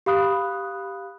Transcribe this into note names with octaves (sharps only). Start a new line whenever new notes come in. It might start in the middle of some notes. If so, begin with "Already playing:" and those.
G4 F5 B5 D#6 F#6